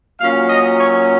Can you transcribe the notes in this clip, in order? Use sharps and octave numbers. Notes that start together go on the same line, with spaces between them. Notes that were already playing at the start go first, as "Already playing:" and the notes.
A#2 F#3 C#4 F5
D#5
C#5